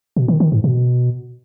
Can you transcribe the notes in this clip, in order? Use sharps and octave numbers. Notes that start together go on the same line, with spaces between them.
B2
D#3
D#3
G#2
B2